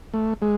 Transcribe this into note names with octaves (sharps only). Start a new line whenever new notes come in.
A3
G#3